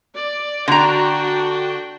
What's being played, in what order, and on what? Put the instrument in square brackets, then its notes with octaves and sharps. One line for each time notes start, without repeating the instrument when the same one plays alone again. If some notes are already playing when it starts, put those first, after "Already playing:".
[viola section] D5
[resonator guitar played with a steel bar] D3 A#5 [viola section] D4 F#4 G5